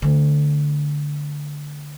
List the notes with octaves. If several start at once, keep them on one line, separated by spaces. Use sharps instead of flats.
D3 A3